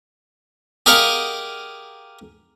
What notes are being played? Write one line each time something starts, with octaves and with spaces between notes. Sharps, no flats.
G4 G#4 A#4 D#5 F5 F#5